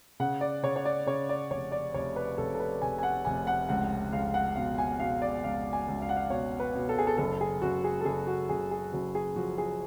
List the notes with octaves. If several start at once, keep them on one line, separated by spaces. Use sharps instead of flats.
C#3 F#5
D5
C#3 C#5
C#5
D5
C#3 C#5
D5
F1 C#5
D5
F1 C#5
B4
F1 A4
A4
B4
F1 G#5
G#5
F#5
F1 G#5
F#5
C#2 F#5
C#2 F5
F#5
B2 F5
G#5
B2 F5
D5
C#2 F5
G#5
C#2
F5
F#5
F5
B2 C#5
B4
B2
A4
G#4
A4
F#1 A4
G#4
F#1 F#4
G#4
A4
F#1 G#4
F#4
F#1 G#4
G#4
F#1 F#4
G#4
F3 F#4
G#4